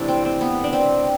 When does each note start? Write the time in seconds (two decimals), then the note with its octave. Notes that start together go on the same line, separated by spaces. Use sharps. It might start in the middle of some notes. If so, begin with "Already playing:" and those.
Already playing: C3 E3 A3 D4 E4
0.08 C4
0.25 C4
0.41 B3
0.64 D4
0.73 C4